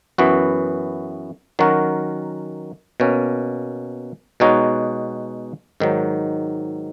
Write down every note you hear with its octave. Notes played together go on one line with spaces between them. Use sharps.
F#2 E3 B3 F#4
D#3 F#3 C#4 F#4 A#4
B2 A#3 C#4
B2 G#3 D#4 F#4 C#5
G#2 D#3 F#3